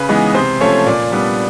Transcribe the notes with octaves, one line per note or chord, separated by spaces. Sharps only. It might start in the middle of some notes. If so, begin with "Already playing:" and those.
Already playing: C#3 B4
E3 G#3 B3 D#4
C3 C5
F3 A3 C#4 C#5
A#2 D5
G3 B3 D4